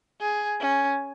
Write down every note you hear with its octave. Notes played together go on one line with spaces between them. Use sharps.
G#4
C#4